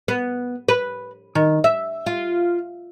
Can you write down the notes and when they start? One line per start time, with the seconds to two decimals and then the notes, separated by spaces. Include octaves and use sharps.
0.08 B3
0.69 B4
1.35 D#3
1.64 E5
2.06 F4